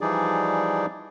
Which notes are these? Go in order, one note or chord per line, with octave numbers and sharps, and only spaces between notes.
E3 F3 G3 D#4 G#4 D5